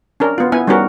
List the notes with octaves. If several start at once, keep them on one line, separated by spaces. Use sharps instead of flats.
C#4 D4 A#4
B3 F4
B3 E4 G#5
G3 B3 C#4 D#4 F#4 A#4